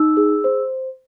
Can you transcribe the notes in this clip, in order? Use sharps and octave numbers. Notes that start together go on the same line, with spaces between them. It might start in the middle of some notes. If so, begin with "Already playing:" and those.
Already playing: D#4 E6
G#4
C5